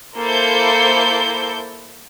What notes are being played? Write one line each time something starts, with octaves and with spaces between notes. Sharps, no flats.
A#3 E4 A4 C5 G6